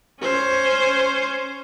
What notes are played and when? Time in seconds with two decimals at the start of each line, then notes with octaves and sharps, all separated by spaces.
0.21 C#4 C5